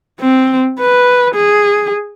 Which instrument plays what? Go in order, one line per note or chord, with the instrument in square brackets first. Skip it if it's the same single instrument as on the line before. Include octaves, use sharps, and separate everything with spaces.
[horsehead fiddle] C4
B4
G#4